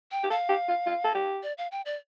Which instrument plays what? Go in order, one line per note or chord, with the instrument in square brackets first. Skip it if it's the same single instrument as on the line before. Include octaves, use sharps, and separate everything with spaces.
[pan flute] G5
[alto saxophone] G4
[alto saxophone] A4 [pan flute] F5
[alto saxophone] G4
F4
F4
A4
G4
[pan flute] D5
F5
G5
D5